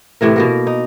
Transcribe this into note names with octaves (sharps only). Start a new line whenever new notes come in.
A2 C3 E3 A#4
B2 A#3 A#4
D#4